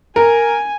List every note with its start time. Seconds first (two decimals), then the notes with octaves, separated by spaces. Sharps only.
0.16 A#4 G#5